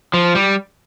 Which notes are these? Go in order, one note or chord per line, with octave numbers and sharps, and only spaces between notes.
F3
G3